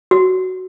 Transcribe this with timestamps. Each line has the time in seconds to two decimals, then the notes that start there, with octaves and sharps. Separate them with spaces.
0.11 F#4